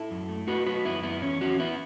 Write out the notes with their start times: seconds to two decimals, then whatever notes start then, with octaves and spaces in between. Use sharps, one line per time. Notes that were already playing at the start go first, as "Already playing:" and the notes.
Already playing: E4 A4
0.11 F#2
0.29 A3
0.47 A3 F#4 B4
0.66 F#3 F#4 B4
0.85 F#2 B3 E4
1.03 F#2 B3 E4
1.22 E2 C#4
1.41 E3 C#4 F#4
1.59 B3 E4